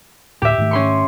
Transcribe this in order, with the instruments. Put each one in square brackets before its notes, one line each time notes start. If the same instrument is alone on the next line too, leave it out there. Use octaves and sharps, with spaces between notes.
[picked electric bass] D2 A2 [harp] G4 E5
[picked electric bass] G#2 D#3 A3
[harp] C#4 C6 C#6